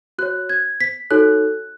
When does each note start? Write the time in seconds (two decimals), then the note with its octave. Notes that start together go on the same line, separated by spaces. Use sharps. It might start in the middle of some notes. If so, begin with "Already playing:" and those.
0.19 F#4 C#5 F#6
0.49 G#6
0.81 B6
1.11 D#4 F#4 A4 C#5 F#6